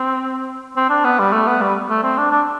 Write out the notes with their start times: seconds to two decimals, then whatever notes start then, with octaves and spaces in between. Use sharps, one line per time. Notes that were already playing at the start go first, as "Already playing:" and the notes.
Already playing: C4
0.77 C4
0.90 D4
1.05 B3
1.19 G3
1.33 A3
1.47 B3
1.61 G3
1.90 A3
2.03 C4
2.18 D4
2.31 D4